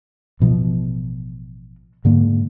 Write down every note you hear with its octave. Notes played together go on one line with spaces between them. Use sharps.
A1 B2 F3
G#2 D3 A#3